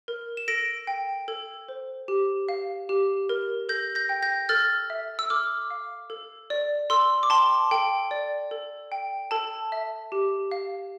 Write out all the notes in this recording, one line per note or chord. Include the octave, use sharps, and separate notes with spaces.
A#4
E7
A4 A#6 D7
G5
A4
C5
G4
F5
G4
A#4
A4 G6 A#6
G6 A#6
G5
G6 A#6
A4 F6 A6
E5
E6
A4 D6 F6
F5
A4
D5
A4 C6 E6
D6
G5 A5 C6
A4 G5
D5
A4
G5
A4 A5
E5
G4
F5